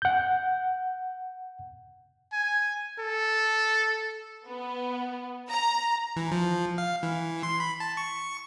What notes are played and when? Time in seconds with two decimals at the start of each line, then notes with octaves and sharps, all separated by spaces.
0.02 F#5 G6
2.32 G#5
2.99 A4
4.46 B3
5.49 A#5
6.16 E3
6.32 F3
6.78 F5
7.03 E3
7.43 C6
7.60 B5
7.80 A5
7.97 C#6